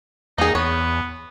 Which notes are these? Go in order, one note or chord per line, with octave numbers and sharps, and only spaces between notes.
E2 A#3 D#4 G#4
E2 B3 C#5